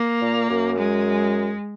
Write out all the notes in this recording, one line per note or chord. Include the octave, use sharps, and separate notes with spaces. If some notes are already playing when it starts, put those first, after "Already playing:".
Already playing: A#3
A#2
F#2
G#3